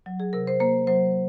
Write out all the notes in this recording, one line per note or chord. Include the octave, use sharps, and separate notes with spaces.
F#3
G#4
C3 A#4
C5
A#3 C5
F#3 C5